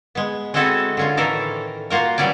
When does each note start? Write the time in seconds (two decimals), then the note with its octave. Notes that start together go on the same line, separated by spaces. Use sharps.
0.15 G#3 B3
0.54 G#3 C4 E4 F#4 A4 D#5
0.97 D3 C#4 F4
1.17 A2 D#3 E3 A4 A#4
1.90 A#3 F4 F#4 A#4
2.18 E3 F#3 G3 C#4 D5